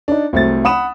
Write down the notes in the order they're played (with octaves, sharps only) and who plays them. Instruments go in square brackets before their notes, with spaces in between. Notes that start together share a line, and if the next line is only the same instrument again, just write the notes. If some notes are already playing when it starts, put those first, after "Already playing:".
[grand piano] D4 D#4
C2 F#3 A3 C5 A6
F#5 B5 D#6 E7